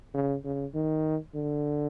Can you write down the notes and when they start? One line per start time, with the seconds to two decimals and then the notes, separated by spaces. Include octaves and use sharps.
0.14 C#3
0.45 C#3
0.74 D#3
1.35 D3